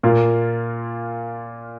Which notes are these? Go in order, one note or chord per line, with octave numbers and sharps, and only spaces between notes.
A#2 A#3 F4